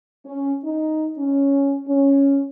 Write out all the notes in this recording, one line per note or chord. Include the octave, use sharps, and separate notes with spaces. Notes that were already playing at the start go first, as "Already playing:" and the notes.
C#4
D#4
C#4
C#4